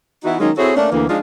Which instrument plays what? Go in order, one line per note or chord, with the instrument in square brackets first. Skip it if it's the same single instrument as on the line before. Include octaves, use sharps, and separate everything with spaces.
[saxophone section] E3 B3 D#4 E4 F#4
D#3 F#3 G#3 A#3 C#4 D#4
C4 E4 F#4 G#4 A4 C#5
A3 A#3 C#4 D4
D2 E3 A#3
F3 G#3 D4 D#4 F4